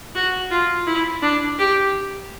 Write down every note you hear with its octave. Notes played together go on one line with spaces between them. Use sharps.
F#4
F4
E4
D4
G4